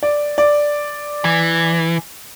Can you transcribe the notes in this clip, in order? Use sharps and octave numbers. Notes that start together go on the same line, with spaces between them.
D5
D5
E3